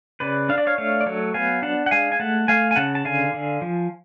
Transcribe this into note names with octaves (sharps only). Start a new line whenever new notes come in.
C#3 B4 D5
D4 F5
D5
C#5 F5
A3 C#5 F5
D5
F#3 A4 C#5
B3 F5 G#5
D4 F#5 A5
F#5
G#3 F5 G#5
G#5
A3 F#5 A5
A3 F5 G#5
G#5
C#3 F#5 A5
A5
D3 F5 G#5
D3
F3